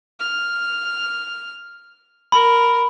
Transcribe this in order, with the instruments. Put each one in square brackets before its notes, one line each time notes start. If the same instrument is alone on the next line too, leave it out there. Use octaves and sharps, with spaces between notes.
[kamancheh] F6
[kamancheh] A#4 [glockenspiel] B5